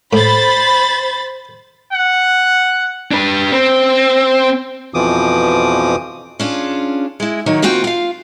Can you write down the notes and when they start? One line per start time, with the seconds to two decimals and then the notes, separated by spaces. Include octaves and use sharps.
0.13 A2 C5 B5 A6
1.93 F#5
3.11 D4 B4
3.52 C4
4.94 F2 B2 E3 F3 D6 D#6
6.40 C#4 D4 F4 G#4
7.20 G#3 E4
7.46 D#3 F#3 A#3 C#5
7.62 A#3 C4 F4 F#4 G5
7.84 F4 F5